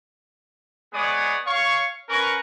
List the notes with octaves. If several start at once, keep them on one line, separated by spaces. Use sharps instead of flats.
G#3 B3 C#5 D5 D#6
C#5 F5 C#6
C#4 A#4 B4 A#5 C#6